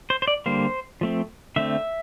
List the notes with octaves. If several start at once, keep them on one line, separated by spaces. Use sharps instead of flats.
C5
C5
D5
D3 G3 A#3 C5
F3 A3 C4
D3 A3 C4 E5